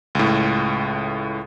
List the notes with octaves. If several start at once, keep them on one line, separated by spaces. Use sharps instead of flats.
C#2 A2